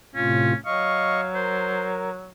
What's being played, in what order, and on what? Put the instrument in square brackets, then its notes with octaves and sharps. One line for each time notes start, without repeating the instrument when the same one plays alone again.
[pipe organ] A2 C3 F4 [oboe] C#4
[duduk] F#3 [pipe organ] D#5 C#6 [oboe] F5
[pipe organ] A#4 [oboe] C5